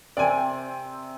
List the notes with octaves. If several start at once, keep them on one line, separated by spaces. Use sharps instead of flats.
C3 C4 D5 G#5